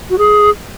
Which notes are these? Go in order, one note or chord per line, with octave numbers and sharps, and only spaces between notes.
F#4
G#4